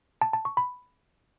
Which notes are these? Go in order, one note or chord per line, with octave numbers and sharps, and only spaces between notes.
A5
A5
C#6
B5